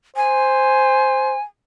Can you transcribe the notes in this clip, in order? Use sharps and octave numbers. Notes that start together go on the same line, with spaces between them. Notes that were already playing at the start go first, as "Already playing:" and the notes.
C5 G#5